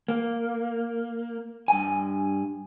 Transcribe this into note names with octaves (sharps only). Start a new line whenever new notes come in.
A#3
G2 G#5